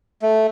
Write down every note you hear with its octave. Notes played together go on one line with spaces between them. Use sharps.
A3